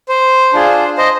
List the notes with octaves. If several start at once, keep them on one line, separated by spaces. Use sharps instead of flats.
C5
D4 F4 G#4
C5 D#5